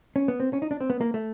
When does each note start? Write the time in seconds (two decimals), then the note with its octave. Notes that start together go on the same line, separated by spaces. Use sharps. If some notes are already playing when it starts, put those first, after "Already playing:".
0.16 C#4
0.28 B3
0.40 C4
0.53 C#4
0.62 D#4
0.71 D4
0.81 C4
0.90 B3
1.01 A#3
1.14 A3